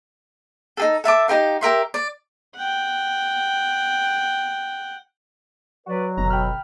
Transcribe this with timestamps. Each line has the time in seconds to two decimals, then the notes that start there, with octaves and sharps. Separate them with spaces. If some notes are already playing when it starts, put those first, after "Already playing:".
0.77 D#4 G#4 A4
1.04 A4 E5 A5 D6
1.28 D#4 G4 A#4 F5
1.61 G4 A#4 E5 C6
1.94 D5
2.56 F#5 G5
5.87 F#3 F#4 B4 D5
6.18 F#1 B2 D3 A#5
6.30 G5 B5 F6